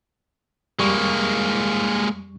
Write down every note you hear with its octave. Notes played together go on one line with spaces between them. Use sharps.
F2 G3 G#3 A#3 C#6